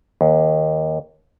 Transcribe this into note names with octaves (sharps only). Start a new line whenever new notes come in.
D#2